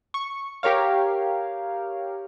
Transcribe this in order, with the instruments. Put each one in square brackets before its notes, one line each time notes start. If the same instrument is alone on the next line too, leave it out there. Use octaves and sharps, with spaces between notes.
[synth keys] C#6
G4 A#4 C#5 F5